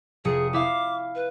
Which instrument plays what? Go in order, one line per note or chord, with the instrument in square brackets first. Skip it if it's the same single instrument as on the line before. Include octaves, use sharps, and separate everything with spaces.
[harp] F1 D#6 C#7 [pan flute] G#4
[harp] E4 E5 F5 [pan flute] D6
[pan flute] B4